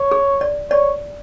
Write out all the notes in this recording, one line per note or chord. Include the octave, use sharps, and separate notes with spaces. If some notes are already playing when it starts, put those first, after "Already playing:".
Already playing: C#5
G#4
D5
C#5 D5